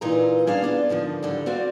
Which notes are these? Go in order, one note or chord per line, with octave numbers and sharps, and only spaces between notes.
A#2 E3 D#4 F4 B4 A#5
C#4 D4 G#4 F5
B3 D4 F4
G#2 D3 D#3 F3
D2 G#2 D3 G3
C4 F#4 D5 F5